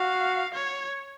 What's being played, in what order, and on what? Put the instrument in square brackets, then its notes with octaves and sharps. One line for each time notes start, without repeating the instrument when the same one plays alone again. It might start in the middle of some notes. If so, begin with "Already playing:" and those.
Already playing: [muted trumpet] F#4 [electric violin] F5
[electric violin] C#5